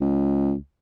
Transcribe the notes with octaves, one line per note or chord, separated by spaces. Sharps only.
C#2